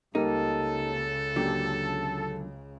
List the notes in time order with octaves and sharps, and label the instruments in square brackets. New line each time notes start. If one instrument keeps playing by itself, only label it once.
[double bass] C#2 C#3 [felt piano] G3 A#3 [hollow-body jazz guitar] D#4 [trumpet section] A4
[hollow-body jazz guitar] F#2 A#2 D3 [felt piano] G4